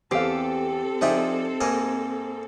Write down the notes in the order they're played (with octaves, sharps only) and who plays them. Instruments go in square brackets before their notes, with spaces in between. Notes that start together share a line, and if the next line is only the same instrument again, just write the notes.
[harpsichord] E2 [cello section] C4 A4 [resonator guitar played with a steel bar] G4 [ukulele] C5 F5
[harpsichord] F3 D4 G#4 [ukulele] D#4 E5 G5
[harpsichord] G#2 A#3 G#5